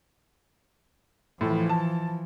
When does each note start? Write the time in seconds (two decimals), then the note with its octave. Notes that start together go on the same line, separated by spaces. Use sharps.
1.41 A2 E3 F3 A4
1.69 A5